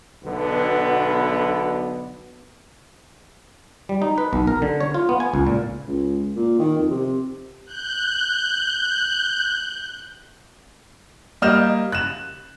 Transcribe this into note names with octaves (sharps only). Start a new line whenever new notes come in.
B1 B2 D3 B3
G3
D#4
B4
B1
A#4
D3
C#5
F4
B3
G#5
C#2
A#2
C#2
A#2
D#3
F2
C3
F#6 G6
G3 A#3 D#5 F6 G6 E7
F#6 E7